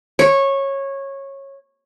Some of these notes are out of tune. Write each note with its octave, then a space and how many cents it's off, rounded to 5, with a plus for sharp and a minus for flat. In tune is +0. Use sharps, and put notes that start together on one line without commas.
C#5 -15